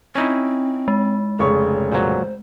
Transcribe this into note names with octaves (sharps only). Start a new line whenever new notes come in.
C4 C#4 D#4 E4
G#3
F1 C#3 C#5 C#6
A#2 F#3 C5